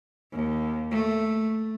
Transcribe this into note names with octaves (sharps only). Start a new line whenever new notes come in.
D#2
A3